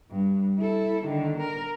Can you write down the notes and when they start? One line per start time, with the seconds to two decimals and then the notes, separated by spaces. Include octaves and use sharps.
0.11 G2
0.59 E4 A4
1.06 D3 D#3
1.38 A#4